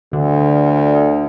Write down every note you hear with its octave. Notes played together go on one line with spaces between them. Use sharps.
D2 D3